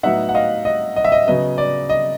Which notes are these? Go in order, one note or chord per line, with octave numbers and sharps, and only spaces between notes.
A2 F#3 B3 D#4 E5 F#5
F#5
D#5 F5
D#5
D#5
E5
D#5
C#3 F#3 B3 D#5
D5
D#5